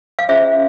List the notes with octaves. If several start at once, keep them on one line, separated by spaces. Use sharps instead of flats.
F5
C#4 F4 G#4 C5 E5